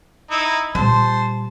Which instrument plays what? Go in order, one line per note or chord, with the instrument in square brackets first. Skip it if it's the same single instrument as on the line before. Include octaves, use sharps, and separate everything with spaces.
[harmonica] D#4 E4
[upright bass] A#2 G3 [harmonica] C5 A5